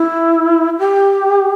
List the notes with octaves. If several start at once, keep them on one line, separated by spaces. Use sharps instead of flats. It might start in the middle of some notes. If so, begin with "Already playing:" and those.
Already playing: E4
G4